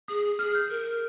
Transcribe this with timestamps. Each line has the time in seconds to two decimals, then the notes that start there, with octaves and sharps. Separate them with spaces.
0.08 G#4 D#6
0.39 G#4 F6
0.55 G6
0.70 A#4